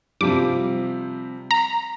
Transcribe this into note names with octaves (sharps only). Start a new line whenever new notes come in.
C3 F3 G3 D6
A#5